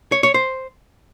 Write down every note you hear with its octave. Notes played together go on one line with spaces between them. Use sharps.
C#5
C#5
C5